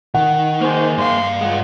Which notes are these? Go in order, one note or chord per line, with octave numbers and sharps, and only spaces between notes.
D#3 F#5
A#3 G#4 C5
G2 F5 C6
G#3 F4 F#5